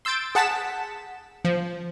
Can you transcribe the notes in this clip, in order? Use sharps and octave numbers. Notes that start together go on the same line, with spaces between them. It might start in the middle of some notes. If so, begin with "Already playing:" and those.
C6 E6 G6 A6 D7
G#4 F#5 A5 A6 B6 E7
F3